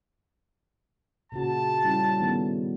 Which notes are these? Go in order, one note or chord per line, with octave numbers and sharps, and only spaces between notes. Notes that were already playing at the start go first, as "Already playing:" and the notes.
A#2 C#3 F#4 A5
G3 C#4 E4
D#3 A3 B3